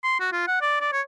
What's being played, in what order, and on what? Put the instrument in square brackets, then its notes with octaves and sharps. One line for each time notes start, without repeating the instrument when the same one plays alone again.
[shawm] C6
F#4
F4
F#5
D5
D5
C#5